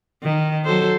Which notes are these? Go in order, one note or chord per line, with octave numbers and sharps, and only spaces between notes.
D#3
F#3 A4 C5